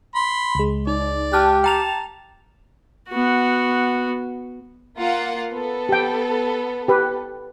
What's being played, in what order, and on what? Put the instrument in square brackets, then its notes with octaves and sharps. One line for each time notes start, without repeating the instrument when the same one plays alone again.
[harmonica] B5 C6
[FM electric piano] C#2 G#3
[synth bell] D#4 [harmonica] D5
[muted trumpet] G4 [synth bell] A5 F6 F#6
[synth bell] G5 A#5 F7 [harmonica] A5
[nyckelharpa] B3 F#4
[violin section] A#3 F4 F#5
B3 A4
[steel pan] G4 G5
G4 B4